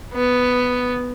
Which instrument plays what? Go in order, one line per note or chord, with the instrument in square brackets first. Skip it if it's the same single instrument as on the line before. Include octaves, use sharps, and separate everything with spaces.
[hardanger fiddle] B3